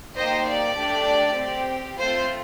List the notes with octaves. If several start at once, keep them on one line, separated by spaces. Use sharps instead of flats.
A#3 D#4 G4 C5 D#5
D5
A3 D4 G4
C4 G4
A3 C4 F4 C5